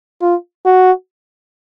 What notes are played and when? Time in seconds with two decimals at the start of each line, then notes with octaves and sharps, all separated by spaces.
0.21 F4
0.65 F#4